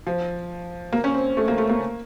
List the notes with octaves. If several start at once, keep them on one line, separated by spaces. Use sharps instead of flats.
F3
A#3
C#4
C4
A3
A#3
A3
A#3